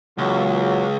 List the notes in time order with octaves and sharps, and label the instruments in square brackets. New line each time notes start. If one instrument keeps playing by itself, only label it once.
[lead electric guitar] C#2 [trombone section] A#2 E3 F#3